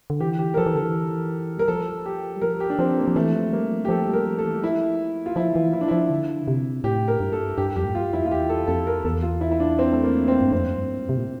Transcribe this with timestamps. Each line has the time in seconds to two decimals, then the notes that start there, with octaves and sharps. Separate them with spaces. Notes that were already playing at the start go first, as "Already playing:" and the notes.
0.10 D3
0.20 E3 G4
0.39 G4
0.54 A#4
0.57 F3 A4
0.66 E3
0.74 D3 A4
0.83 E3
1.58 G3 A#4
1.68 F3 A4
2.06 G4
2.36 G3
2.41 F3 A#4
2.60 G4
2.70 D4
2.79 F3 C4
2.98 A#3
3.08 F3
3.16 E3 A3
3.34 F3
3.52 G3 A#3
3.71 F3
3.85 G4
3.89 F3 A4
4.08 G3
4.13 A#4
4.26 F3
4.38 A4
4.45 E3
4.57 G3
4.63 F3 E4
5.26 F4
5.36 F3 E4
5.56 E3
5.73 F3 E4
5.81 D4
5.88 F3 E4
6.10 D3
6.48 C3
6.84 A2 G4
7.08 A#4
7.20 G2
7.32 A4
7.58 G2 G4
7.76 F2 G4
7.85 A2
7.94 G2 F4
8.13 F2 E4
8.26 F4
8.31 E2 G4
8.49 A4
8.67 F2 A4
8.87 A#4
9.05 E2 A4
9.23 F4
9.41 E4
9.51 E4
9.60 D4
9.79 C4
9.92 A3
10.04 A#3
10.28 C4
10.41 G2
10.52 F2 C4
10.77 G2
11.09 C3
11.18 A#2